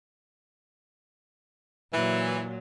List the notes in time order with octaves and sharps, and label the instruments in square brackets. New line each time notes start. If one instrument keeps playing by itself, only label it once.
[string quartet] A#2 F#3 [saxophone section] E3